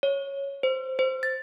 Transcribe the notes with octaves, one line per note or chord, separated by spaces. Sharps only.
C#5
C5
C5
A6